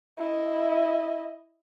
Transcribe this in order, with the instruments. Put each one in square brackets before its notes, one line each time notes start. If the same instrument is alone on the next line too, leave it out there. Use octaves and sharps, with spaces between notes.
[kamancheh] E4 D#5